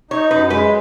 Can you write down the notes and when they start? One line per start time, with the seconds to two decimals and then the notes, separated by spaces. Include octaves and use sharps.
0.11 D#4 C#5
0.31 F#2 B4
0.50 G#3 B4